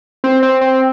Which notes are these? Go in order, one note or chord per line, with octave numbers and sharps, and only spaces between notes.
C4
C4
C4